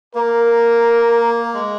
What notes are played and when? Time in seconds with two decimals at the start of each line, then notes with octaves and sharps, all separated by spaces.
0.15 A#3 A#4
1.54 G#3